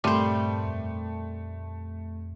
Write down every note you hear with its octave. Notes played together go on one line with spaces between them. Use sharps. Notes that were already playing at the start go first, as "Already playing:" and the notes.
G2 A#2 G3 A3 C4 C5 C6
F2